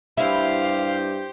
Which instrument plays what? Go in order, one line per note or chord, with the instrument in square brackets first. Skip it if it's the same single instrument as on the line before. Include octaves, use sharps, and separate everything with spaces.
[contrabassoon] G2 [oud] E4 [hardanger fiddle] G4 C5 [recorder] F5